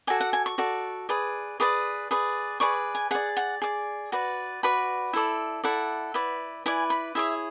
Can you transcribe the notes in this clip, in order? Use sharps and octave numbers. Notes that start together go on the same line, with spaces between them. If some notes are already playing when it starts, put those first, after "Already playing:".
F#4 A4 D5 G#5
F#5
G#5
C#6
F#4 A4 D5
G#4 B4 D5
G#4 B4 D5 D6
G#4 B4 D5
G#4 B4 D5 C#6
G#5
G#4 D5 F#5
F#5
G#4 D5
F#4 B4 D5
F#4 B4 D5 B5
E4 A4 D5
E4 A4 D5 F#5
E4 B4 D5
E4 B4 D5 G#5
B5
E4 G#4 C#5 E5